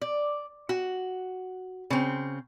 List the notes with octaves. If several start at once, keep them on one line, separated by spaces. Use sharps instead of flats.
D5
F#4
C#3 C4